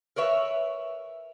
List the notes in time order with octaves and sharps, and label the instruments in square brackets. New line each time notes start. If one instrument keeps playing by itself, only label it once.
[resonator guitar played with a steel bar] A#4 B4 C#5 E5